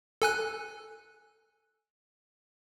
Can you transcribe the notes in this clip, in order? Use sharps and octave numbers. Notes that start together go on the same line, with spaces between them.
A4 G#5 F#6